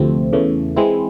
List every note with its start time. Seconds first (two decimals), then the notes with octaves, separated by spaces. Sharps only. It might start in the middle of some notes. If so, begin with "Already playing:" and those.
Already playing: D2 C3 F3 A3 C4
0.33 E2 C#3 E3 A3
0.76 E3 G#3 C4 E4